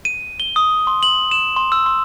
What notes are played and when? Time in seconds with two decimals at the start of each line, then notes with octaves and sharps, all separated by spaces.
0.05 D#7
0.40 G7
0.56 D#6
0.87 C6
1.03 F#7
1.31 E7
1.56 C6
1.72 E6
1.86 C6